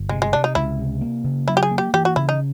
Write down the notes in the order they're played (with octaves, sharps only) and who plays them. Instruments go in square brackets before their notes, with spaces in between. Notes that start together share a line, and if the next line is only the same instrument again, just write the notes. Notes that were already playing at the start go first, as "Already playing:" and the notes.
Already playing: [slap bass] G1
[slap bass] C3 [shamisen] G#3
[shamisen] G#3
[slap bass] C3 [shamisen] D4
[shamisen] D#4
[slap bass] C#2 [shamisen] E4
[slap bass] C3
A#3
C#3
[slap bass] F#3 [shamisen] E4
[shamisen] G4
G#4
[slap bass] A#3
[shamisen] G4
[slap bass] E3 [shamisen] G4
[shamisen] F#4
[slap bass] C#3 [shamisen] E4
[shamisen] D#4